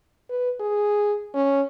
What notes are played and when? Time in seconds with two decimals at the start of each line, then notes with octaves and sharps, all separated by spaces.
0.30 B4
0.60 G#4
1.34 C#4